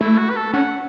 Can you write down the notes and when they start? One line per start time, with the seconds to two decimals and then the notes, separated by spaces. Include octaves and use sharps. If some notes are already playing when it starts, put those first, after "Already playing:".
0.01 A3 E4
0.18 F#4
0.30 B4
0.36 A4
0.53 C#4 F#5